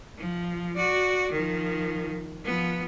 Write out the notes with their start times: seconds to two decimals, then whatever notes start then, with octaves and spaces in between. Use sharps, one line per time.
0.17 F3
0.76 F#4 D5
1.31 D#3 F3
2.44 F3 B3